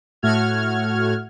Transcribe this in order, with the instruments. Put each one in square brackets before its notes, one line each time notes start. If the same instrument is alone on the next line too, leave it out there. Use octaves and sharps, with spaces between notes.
[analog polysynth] A2 A3 F#4 F#5 F6 G#6